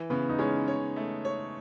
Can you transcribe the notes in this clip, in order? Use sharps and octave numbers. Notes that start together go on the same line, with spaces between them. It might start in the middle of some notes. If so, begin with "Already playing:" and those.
Already playing: E3
C#3 B3
D#4
G#3 C#4
C#5
A3
C#5